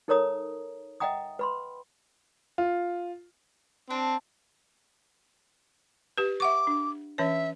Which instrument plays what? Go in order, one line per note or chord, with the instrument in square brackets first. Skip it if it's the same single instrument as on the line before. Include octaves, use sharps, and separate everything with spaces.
[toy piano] D#4 A4 A#4 C#5 A#5 D#6
D#5 E5 F#5 G5 A#5 D#6
B4 B5 C6
[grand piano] F4
[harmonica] C4 [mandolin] D4
[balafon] G4 B4
[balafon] E5 F#5 C#6 [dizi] D6
[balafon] D4
[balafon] E3 C#4 C#5 [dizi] E5